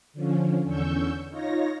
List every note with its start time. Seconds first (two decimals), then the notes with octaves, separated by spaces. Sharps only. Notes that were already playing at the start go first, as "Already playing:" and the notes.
0.13 D3 F3 C#4
0.64 E2 D3 C#4 C#6 E6 G6
1.30 D#4 F4 C#5 A#6